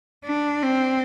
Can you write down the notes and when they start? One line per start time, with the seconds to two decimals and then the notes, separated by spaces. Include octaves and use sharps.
0.25 D4
0.63 C4